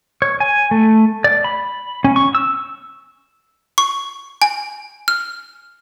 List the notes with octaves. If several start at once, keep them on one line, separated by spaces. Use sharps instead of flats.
C#5
G#5
A3
D5
B5
C#4
C#6
E6
C#6
G#5
F6